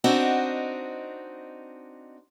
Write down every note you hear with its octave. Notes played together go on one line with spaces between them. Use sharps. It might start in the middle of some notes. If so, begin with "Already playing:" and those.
C4 D4 D#4 F#4 D#5